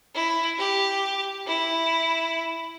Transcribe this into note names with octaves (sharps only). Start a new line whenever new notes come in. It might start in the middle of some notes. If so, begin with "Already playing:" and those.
E4
G4
E4